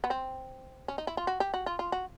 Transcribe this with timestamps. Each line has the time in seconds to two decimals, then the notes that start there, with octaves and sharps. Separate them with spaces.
0.04 B3
0.10 C4
0.88 C#4
0.98 D#4
1.07 E4
1.17 F4
1.27 F#4
1.40 G4
1.54 F#4
1.66 F4
1.79 F4
1.92 F#4